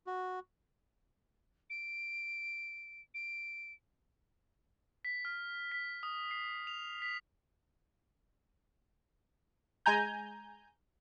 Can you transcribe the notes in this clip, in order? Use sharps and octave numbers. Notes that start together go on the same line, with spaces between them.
F#4
D7
D7
B6
F6
B6
D#6
C7
F7
B6
G#3 G#5 A#5 G6